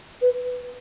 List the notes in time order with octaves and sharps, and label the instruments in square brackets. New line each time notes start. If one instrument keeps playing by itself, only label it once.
[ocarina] B4